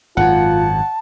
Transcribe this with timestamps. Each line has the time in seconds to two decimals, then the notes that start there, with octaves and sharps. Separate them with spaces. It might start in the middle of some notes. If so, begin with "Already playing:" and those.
0.17 G#1 F#2 F4 F#5 A5